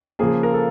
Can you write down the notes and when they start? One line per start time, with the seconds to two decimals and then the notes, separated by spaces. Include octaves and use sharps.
0.19 C#3 F3 A#3 G#4
0.43 A#4
0.53 A4